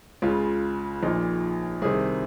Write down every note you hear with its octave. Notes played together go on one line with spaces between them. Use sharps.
C#2 C#3 F4
A#1 A#2 D#4
C2 C3 D#3 G#4